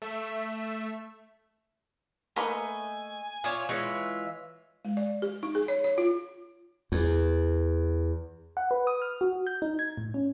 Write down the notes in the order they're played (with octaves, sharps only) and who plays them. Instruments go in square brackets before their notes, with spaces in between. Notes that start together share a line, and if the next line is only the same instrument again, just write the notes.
[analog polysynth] A3 E5
[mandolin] A3 D#5 [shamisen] A#3 A#4 B4 [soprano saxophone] G#5
[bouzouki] F4 C#5 [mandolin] D5 E5 D#6
[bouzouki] E3 G#3 F4 [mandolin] C#5 E5
[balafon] G#3
D5
G4
D#4
G#4
C#5
C#5
F4
[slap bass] E2
[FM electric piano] F#5
B4
D#6
F6
F#4
G6
D#4
G#6
A2
C#4